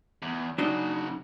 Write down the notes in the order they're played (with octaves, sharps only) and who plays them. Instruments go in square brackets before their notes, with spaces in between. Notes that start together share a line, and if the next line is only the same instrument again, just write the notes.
[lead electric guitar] E2
[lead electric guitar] F#2 C#3 [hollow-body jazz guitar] D4 D#4 F#4